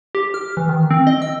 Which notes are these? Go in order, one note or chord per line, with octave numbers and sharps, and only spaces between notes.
G4
F6
E3
D#3
C4
D#5
E6